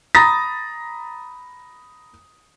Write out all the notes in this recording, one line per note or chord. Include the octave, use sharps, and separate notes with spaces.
A#5 B5 D#6 A6 A#6